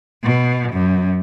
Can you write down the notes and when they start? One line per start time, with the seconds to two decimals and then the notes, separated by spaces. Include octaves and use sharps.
0.23 B2
0.72 F#2